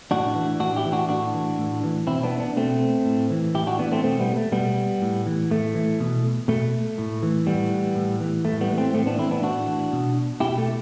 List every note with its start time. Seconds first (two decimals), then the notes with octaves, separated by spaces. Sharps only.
0.11 A2 D4 F#4
0.35 E3
0.60 A2 D4 F#4
0.76 E4 G4
0.85 E3
0.92 D4 F#4
1.09 A2 D4 F#4
1.34 E3
1.58 A2
1.84 E3
2.07 B2 C4 E4
2.23 B3 D4
2.40 B3 D4
2.57 B2 A3 C4
3.05 A2
3.30 E3
3.54 A2 E4 G4
3.67 D4 F#4
3.79 E3 B3 D4
3.92 A3 C4
4.04 B2 A3 C4
4.20 G3 B3
4.37 A3
4.52 B2 G3 B3
5.02 A2
5.26 E3
5.51 A2 A3
5.75 E3
6.00 B2
6.48 B2 A3
6.98 A2
7.23 E3
7.47 A2 G3 B3
7.71 E3
7.95 A2
8.21 E3
8.45 A2 A3
8.61 G3 B3
8.70 E3
8.78 A3 C4
8.94 A2 A3 C4
9.06 B3 D4
9.18 E3 C4 E4
9.31 B3 D4
9.42 A2 D4 F#4
9.67 E3
9.92 B2
10.40 B2 E4 G4
10.58 A3